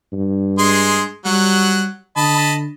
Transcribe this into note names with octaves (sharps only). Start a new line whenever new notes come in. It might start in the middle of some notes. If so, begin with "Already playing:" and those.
G2
G#3 G#4 C6
F#3 G3 F#5
D3 D#5 A5 B5